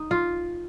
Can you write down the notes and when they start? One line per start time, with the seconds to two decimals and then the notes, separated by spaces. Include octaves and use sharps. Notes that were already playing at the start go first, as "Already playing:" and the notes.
Already playing: D#4
0.11 F4